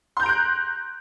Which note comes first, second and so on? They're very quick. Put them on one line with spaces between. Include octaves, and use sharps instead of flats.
C6 G6 A#5 D7 F#6